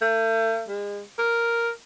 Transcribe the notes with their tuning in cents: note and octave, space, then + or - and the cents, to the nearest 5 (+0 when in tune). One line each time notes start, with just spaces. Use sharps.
A3 +40
G#3 -35
A#4 +0